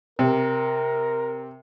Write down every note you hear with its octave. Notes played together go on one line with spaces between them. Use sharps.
C3 A#4